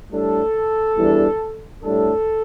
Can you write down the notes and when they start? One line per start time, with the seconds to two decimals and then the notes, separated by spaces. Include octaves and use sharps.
0.11 A2 G3 D4 A4
0.97 E2 E3 G3 D4
1.83 A2 G3 D4 A4